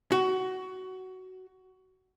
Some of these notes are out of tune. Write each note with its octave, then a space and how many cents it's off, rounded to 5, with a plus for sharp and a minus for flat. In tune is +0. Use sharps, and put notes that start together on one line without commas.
F#4 +15